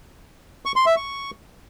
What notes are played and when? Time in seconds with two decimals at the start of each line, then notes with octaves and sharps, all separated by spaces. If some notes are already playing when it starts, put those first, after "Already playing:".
0.65 C#6
0.76 C6
0.86 E5
0.96 C#6